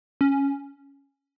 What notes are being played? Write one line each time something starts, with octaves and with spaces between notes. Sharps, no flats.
C#4